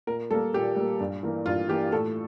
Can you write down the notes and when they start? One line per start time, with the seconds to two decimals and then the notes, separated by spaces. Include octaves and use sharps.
0.07 A#2 A#4
0.31 G3 A#3 A4
0.54 A#2 G4
0.76 G3 A#3
1.00 G2
1.23 E3 A#3
1.46 G2 F4
1.69 E3 A#3 G4
1.92 A2 A4